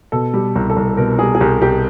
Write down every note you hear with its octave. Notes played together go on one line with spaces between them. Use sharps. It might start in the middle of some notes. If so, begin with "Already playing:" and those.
B2 A4
G3
C2
A4
C2
B2 A#4
G3 G#4
G#4
C2 G4
C2 G4